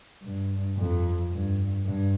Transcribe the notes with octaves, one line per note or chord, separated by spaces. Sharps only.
G2
F2
G2
G2